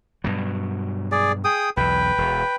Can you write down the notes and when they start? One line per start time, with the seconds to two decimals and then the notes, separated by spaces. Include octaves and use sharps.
0.24 G2 B2 F#3
1.12 G#4 D5
1.45 G#4 G5 D#6
1.77 B1 E2 B4 G5
2.18 E1